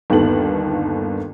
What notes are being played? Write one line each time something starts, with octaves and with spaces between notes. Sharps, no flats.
G1 D#2 D#3 B3 A4 F#7